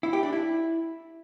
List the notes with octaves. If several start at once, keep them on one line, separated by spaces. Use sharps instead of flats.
E4
G4
D4
E4